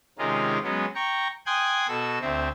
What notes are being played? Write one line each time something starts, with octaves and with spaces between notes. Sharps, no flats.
C3 D#3 G#3 C#4 F4 A#4
F#3 G#3 B3 C#4
G5 A#5 C#6
G5 G#5 C6 D#6 F#6 G#6
B2 F#4 A4 E6
D2 C4 C5 E5